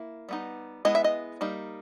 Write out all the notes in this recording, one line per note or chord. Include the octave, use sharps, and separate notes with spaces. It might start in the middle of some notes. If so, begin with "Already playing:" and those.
Already playing: A#3 E4
G3 B3 D#4
G#3 B3 E4 D#5
E5
D#5
G3 A#3 D#4